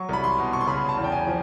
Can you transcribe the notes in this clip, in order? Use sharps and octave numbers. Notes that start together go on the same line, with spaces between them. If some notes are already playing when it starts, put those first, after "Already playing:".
Already playing: F#3 C#6
C2 B5
C6
B2
C#6
C6
C#3 B5
A5
E2
G5
G#5
F3